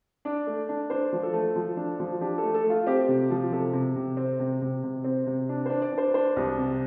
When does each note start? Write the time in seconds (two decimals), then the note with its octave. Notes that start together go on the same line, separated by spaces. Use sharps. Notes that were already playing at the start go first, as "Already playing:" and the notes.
0.25 D4 D5
0.47 A3
0.69 D4
0.90 D4 C5
1.13 F3
1.23 A4
1.33 A3
1.56 F3
1.77 D4
2.00 F3
2.21 D4 G4
2.38 A4
2.43 A3
2.54 A4
2.64 A3
2.70 F4
2.87 C4 G4
3.08 C3
3.30 F3
3.52 C3 A4
3.73 C3
3.96 C3
4.17 C4
4.40 C3
4.62 C3
4.83 C3
5.04 C4
5.27 C3
5.49 D4
5.66 D4 C5
5.82 D5
5.92 D4
5.98 C5
6.14 D4 C5
6.37 C2
6.58 C3